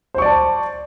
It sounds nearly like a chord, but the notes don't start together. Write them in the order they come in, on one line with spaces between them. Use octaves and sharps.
C5 C#6 D5 A5